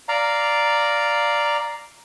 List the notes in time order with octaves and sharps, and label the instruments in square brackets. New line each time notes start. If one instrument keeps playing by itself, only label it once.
[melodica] D5 F5 A#5